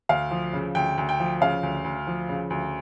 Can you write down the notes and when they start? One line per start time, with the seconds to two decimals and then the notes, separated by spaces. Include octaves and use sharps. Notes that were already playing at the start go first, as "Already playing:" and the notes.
0.09 D2 F5
0.31 F3
0.53 C#3
0.75 D2 G5
0.98 D2
1.09 G5
1.20 F3
1.41 C#3 F5
1.63 D2
1.84 D2
2.07 F3
2.29 C#3
2.50 D2